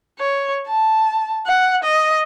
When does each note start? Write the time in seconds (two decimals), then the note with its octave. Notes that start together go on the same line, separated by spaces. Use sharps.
0.19 C#5
0.67 A5
1.47 F#5
1.83 D#5